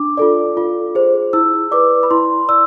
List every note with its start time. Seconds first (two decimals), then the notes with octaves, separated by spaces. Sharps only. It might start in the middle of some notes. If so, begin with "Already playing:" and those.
Already playing: D4 D6
0.17 F4 A4 D5
0.57 F4
0.95 G#4 C5
1.33 E4 E6
1.72 B4 D5 D6
2.03 B5
2.11 E4 C6
2.49 D5 E6